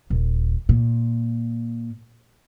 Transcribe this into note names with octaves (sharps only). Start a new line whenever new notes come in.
D#1
A#2